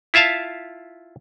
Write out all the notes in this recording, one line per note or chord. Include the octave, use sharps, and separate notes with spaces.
E4 F4 E5 F5 A5